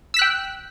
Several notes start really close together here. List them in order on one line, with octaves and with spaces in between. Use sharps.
E6 B6 F#6 G5